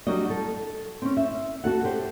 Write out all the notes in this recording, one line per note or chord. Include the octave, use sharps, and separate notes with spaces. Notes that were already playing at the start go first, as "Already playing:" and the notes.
F#3 G3 D4 F#4 D#5
A4
C4 C#4
E5
F#4 A4 F#5
G4 C5